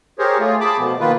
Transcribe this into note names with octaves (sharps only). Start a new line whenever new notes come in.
G4 G#4 A#4 C5 C#5
A3 F4 G#4
G#4 A5 B5 D6
B2 F3 A3 B3
D#3 A#3 B3 F4 B4